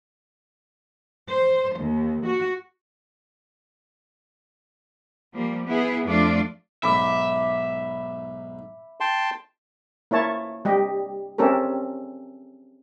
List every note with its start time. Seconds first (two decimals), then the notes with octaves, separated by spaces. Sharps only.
1.31 C5
1.79 D#2
2.26 F#4
5.34 F3 G3 A#3
5.65 B3 E4 G#4
6.04 F2 F3 A3 D4 F4 D5
6.83 B1 G#2 E5 B5 D6
9.00 G5 A5 C6
10.11 A#3 E4 C#5 A5
10.65 G3 G4 D#5
11.38 C4 C#4 G4 A4 A#4